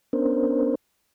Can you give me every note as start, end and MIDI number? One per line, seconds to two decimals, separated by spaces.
0.13 0.75 59
0.13 0.75 61
0.13 0.75 62
0.13 0.75 70
0.13 0.75 72